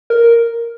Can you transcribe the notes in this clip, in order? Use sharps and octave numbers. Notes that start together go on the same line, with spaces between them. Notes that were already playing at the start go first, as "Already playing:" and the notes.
A#4